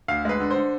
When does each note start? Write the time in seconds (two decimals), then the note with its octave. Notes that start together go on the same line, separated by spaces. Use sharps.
0.08 D2 F5
0.25 G#3 B4
0.40 D3
0.51 C5
0.56 D3